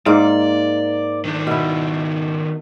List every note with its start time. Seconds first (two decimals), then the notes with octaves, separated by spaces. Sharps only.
0.06 G#2 A#3 D5
1.25 D#3 D4
1.47 B2 E4